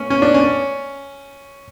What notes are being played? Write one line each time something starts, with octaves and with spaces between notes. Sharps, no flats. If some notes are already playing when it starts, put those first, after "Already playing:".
Already playing: A3 C#4
C#4
D4
C#4